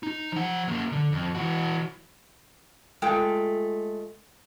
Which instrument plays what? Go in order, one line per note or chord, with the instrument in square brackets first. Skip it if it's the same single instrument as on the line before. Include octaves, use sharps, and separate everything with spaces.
[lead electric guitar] D#4
F3 F#5
F#3 A#3
D3
F2
E3 F#4
[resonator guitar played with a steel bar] G#3 A3 F4 A4 G5